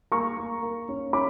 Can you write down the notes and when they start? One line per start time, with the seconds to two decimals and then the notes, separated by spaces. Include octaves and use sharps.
0.12 A#3 A#5 C#6
0.37 A#3
0.63 A#3
0.89 C#4
1.13 C#4 B5 D6